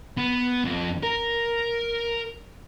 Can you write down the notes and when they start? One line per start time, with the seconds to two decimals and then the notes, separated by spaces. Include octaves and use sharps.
0.17 B3
0.65 F2
1.03 A#4